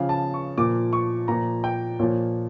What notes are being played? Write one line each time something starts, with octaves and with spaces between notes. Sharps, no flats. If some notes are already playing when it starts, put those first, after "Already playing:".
Already playing: C#3 F3 F5
A5
C#6
A#2 F3 D6
C#6
A#2 F3 A#5
G5
A#2 F3 C#5